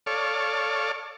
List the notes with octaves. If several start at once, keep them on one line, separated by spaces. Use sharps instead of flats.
A4 C#5 D5 F5